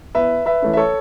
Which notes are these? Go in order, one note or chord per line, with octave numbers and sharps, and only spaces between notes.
E2 B4 E5
B4 E5
E3 A3 C#4
E5
A4 C#5